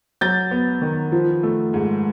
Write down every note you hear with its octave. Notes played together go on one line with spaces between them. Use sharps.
F#3 G6 A6
B3
D#3
F3
A3
G#2